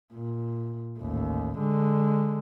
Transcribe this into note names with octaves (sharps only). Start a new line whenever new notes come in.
A#2
A1 D#2
D3 G#3